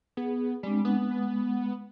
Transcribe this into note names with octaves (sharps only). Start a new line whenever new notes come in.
B3 G#4
G3 G#3 C4 D4
B3
G#3